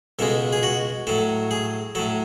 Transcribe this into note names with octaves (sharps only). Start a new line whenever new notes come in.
C#2 B2 G#3 A4
G#4
F#4
A2 F#3 A4
G#4
A2 F#3 A4